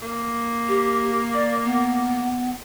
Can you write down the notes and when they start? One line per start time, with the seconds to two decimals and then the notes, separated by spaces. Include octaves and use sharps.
0.02 A#3
0.68 G4
1.34 D5
1.64 B3